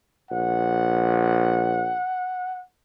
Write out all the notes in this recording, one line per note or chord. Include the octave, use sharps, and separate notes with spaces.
A#1 F#5